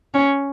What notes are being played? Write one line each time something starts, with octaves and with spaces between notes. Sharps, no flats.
C#4